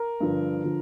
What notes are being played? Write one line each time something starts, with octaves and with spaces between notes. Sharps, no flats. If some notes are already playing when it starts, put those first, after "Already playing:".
Already playing: A#4
G2 D3 F3
D3 F3